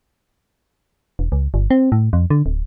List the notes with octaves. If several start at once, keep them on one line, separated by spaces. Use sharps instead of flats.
E1
C#2
G1
C4
A2
F2
D3
D1